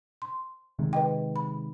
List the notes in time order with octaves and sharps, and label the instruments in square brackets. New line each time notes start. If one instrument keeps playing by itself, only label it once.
[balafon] C6
[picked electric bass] C3 D#3 G#3
[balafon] B4 D#5 G5
B5